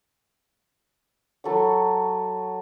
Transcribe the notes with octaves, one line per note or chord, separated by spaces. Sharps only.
F#3 A4 B5 C#6